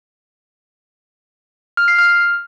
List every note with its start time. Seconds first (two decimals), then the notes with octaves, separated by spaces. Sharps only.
1.77 F6
1.88 C7
1.99 F6